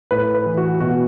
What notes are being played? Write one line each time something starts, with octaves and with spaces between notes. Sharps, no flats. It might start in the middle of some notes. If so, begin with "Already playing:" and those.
A2 B4
B4
E3
F#4
B2 F#4